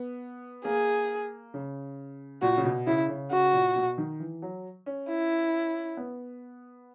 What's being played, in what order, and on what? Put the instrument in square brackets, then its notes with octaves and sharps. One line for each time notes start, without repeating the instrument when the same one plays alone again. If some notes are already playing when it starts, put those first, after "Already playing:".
Already playing: [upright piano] B3
[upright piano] A#3 [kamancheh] G#4
[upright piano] C#3
[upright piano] A#2 [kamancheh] F#4
[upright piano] C#3
B2
[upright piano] C#3 [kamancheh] E4
[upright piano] C#3
[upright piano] C#3 [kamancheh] F#4
[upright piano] A#2
B2
D#3
E3
F#3
C#4
[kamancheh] E4
[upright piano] B3